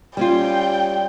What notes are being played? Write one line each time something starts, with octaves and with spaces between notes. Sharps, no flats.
G3 C#4 F4 G5